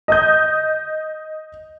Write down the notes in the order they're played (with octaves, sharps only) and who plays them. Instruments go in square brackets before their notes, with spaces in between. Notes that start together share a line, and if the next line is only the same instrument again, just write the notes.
[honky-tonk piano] D#5 D#6 G6